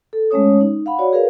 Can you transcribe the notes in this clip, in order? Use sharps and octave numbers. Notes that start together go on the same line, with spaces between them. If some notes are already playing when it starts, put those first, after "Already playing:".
A4
G#3 A3 C#4 C#5 D#6
D#4
F5 F#5 B5
F#4 C#5 D5
G#4 A#4 B4 F5